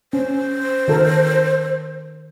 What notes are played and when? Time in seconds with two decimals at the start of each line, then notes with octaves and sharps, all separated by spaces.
0.13 C#4 C5
0.88 D#3 A4 A#4